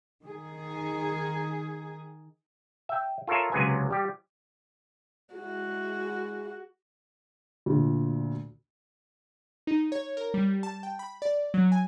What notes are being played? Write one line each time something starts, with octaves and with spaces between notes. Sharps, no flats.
D#3 G#4
E5 G5
F4 A4 A#4 C#5 E5
C#2 C3 F#3 G#4 B4 G#5
G3 G4
G#3 E4 F#4 G#4
D2 A#2
D#4
C#5
A#4
G3
A5
G5
B5
D5
F#3
G#5